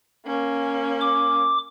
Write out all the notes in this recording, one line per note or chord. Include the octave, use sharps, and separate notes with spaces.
A#3 C#4
D6